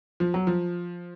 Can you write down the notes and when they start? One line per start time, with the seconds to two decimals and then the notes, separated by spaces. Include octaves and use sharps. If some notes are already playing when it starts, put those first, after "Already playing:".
0.20 F3
0.34 F#3
0.47 F3